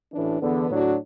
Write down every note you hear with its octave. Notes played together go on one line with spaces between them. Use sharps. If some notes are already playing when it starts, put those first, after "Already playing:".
A1 A2 E3 D4
E2 D3 B3
A2 F#3 D4 F#4